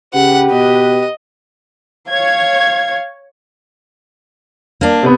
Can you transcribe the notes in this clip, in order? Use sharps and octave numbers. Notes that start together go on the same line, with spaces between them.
C#3 G4 B4 F#5
B2 D#5
C#5 F5 G#6
A#3 D4
C3 B3